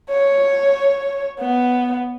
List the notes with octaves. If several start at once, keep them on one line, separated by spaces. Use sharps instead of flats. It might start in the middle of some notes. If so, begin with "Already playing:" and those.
C#5
B3